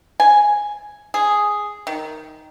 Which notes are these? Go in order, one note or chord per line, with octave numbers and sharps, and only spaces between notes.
G#5
G#4
D#3